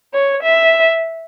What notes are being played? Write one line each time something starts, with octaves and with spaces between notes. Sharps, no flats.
C#5
E5